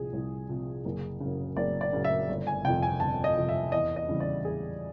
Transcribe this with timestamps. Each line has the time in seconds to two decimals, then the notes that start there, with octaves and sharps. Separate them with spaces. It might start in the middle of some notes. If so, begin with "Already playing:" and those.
Already playing: C2 C3 F3 G#4
0.13 C2
0.49 C3 F3
0.85 F#1
1.20 C#3
1.25 F#2
1.57 F#1 D5
1.81 D5
1.93 F#2 C#3
2.04 E5
2.29 G1
2.47 G#5
2.64 F2 C3 G5
2.82 G#5
3.00 G1 A5
3.24 D#5
3.36 F2 C3
3.49 E5
3.72 E2 D#5
3.96 D#5
4.08 C#3 E3 G3
4.20 D5
4.44 E2 G#4